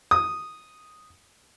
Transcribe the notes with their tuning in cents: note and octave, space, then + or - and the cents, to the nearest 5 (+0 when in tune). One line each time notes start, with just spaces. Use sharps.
D#6 -5